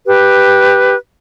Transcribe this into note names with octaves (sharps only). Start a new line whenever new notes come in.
G4 B4